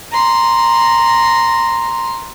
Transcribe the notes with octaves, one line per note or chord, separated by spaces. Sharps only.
A#5 C6